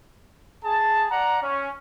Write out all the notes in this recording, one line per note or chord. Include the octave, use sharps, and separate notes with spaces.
G#4 A5
D5 F#5 A#5
C#4